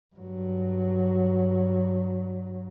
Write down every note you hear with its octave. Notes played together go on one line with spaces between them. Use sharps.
G2 F#3